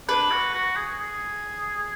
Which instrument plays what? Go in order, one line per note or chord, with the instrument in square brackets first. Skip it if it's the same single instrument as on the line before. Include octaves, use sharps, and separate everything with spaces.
[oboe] D4 [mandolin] B4
[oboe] F#4
F#4
G#4
G#4